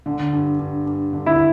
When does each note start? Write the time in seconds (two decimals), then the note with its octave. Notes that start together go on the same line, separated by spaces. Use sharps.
0.06 D3
0.33 G2
0.59 G2
0.86 G2
1.13 D3
1.26 E4